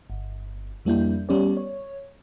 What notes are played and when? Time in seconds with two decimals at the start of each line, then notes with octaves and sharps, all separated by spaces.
0.10 G1
0.85 F2 G3 A#3 D4 E4 G6
1.29 G3 B3 C#4 G4 C#5 D5
1.57 C#5